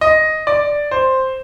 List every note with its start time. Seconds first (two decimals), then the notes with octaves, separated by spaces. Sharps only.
0.01 D#5
0.47 D5
0.91 C5